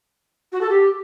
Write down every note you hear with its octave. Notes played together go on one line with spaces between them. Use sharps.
F#4
A4
G4